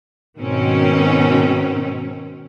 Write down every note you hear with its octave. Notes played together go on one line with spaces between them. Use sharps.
G#2 B2 D#3 C4 C#4